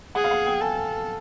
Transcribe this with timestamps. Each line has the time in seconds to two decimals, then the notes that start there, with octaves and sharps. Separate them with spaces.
0.15 G#4 F#5
0.24 F5
0.31 F#5
0.46 G5
0.61 A4 G#5